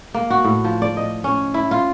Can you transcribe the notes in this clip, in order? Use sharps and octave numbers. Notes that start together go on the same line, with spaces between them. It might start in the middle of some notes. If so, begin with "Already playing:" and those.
A#3
F#4
A2
F3
D5
D#5
C#4
E4
F4